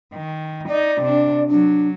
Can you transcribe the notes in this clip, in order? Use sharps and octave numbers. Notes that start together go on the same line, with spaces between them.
D#3
D#4 D5
C3 D4
F#3 D4